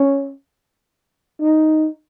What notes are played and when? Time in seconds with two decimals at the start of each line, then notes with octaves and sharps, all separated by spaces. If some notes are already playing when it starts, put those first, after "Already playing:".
Already playing: C#4
1.41 D#4